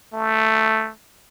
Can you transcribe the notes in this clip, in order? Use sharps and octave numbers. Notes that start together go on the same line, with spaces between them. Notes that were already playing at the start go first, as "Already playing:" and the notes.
A3